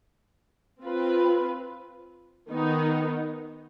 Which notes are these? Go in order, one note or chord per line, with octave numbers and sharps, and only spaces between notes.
C4 F4 B4
D#3 B3 D#4